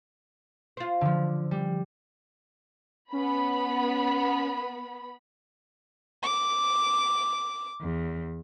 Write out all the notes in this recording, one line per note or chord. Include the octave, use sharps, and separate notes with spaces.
F4 C5
D3 F3
G3
B3 C#4 B5
D6
E2